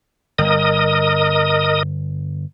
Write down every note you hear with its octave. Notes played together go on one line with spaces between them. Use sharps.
G1 A#4 D#5 D#6